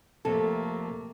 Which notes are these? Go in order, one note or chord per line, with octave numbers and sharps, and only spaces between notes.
F2 C3 A3 A#3 A4